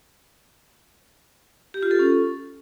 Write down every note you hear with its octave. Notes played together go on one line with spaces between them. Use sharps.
G4
F4
A4
C#4